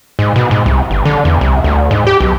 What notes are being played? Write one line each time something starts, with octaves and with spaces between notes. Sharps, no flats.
G#2
B2
G#2
C2
G1
D3
E2
C2
D2
G#2
G4
B1